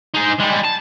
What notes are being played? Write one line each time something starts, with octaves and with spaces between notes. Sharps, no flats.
D#4 G#4
G3 G#3
A5